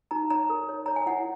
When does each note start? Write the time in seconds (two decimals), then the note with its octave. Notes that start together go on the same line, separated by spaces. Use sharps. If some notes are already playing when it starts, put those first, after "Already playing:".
0.11 D#4 A#5
0.30 C#5 A#5
0.50 A#4
0.69 C#5
0.86 C#5 A#5
0.96 G#5
1.06 E4 F#5